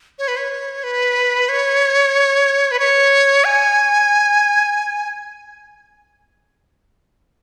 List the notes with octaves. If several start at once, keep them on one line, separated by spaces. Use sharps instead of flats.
C#5
B4
C#5
B4
C#5
B4
C#5
G#5